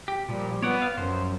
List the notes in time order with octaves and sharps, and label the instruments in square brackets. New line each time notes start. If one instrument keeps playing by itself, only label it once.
[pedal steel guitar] G4
[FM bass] A#2 [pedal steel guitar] F3 G3
[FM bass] B3 [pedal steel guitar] C#5 D5 F#5
[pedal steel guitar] F5
[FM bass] F#2 [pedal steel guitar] F3 C5